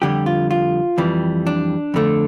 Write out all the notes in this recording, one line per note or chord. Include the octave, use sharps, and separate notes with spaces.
F2 D3 G3 G4
F4
F4
F2 E3 G3
D4
F2 D3 A3